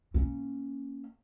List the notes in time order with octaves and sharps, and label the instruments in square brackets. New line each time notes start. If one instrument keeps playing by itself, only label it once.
[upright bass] A#3 C#4